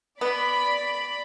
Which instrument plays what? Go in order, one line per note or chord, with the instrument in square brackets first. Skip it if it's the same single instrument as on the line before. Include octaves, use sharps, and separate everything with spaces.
[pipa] B3 [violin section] D5 B5